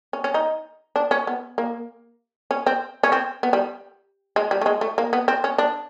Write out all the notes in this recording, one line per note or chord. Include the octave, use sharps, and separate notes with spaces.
C#4
C#4
D#4
D4
C#4
B3
A#3
C#4
C4
C#4
C4
B3
G3
G#3
G3
A3
G#3
A3
A#3
B3
C4
C#4
D4